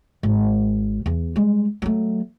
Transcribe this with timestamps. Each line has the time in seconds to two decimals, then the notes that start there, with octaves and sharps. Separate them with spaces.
0.23 G#1
1.06 E2
1.36 G3 G#3
1.82 F#3 A3